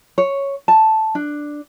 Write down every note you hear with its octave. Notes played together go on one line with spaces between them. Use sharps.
C#5
A5
D4